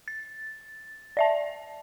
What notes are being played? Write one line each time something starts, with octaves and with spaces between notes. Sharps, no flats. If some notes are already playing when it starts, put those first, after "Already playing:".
A6
D5 E5 A5